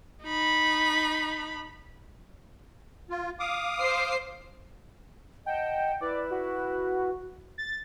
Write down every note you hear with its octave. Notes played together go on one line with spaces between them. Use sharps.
D#4 B5
F4
F5 D6 D#6
C5 C7
D#5 F#5 G5 A5
E4 B4 D5
F#4
A6